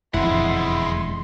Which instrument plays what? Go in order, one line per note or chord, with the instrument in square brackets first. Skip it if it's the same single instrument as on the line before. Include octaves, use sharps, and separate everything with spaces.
[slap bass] E1 F2 D3 [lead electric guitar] G#3 F#5 [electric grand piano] E4 [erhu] C6